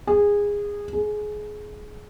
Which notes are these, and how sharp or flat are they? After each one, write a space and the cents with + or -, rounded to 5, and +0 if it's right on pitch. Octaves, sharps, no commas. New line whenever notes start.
G#4 -20
G#4 +20